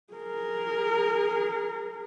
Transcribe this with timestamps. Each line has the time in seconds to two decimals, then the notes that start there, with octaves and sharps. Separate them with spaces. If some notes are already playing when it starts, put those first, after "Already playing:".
0.13 G#4 A#4